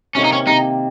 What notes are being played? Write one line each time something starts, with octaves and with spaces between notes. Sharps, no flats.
C3 D#3 A#3 C#4
D#4
C#4
C3 D#3 A#3 D#4